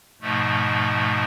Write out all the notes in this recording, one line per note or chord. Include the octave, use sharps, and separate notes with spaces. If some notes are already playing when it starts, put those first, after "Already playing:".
G#2 B2 F3 A3